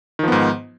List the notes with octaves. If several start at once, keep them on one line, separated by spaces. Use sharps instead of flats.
G#2 D#3 F3 B3